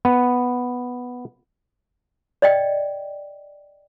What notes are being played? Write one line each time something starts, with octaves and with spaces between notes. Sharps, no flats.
B3
D5 D#5 G5